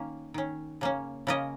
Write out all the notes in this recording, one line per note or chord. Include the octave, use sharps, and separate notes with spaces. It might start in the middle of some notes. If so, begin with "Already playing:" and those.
Already playing: D#3 A#3 C#4
D#3 C#4
C#3 A#3 C#4
C#3 A#3 C#4 A#4 D#5